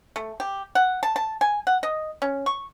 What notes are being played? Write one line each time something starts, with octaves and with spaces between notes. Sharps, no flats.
A3
G4
F#5
A5
A5
G#5
F#5
D#5
C#4
C#6